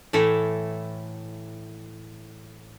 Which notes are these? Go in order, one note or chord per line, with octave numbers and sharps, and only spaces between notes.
A2 E3 A3 A4